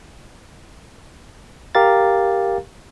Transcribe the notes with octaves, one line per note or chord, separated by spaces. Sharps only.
G4 A#4 F5 A#5 A6